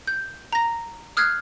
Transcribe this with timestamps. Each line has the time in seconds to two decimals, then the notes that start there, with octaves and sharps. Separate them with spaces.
0.07 G6
0.53 A#5 A#6
1.17 D#6 F6 F#6 G#6 C7